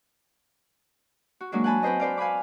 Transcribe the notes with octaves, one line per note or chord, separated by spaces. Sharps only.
F#4
F#3 G#3 A#3 D4 F#4
F#5 G#5 A5 B5
C4 B4 C5 D#5
B4 C5 D5 F5
F5 G#5 B5 D6